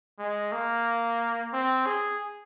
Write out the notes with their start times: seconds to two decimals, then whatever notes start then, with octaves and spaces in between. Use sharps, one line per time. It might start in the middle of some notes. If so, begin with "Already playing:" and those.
0.19 G#3
0.52 A#3
1.53 C4
1.86 G#4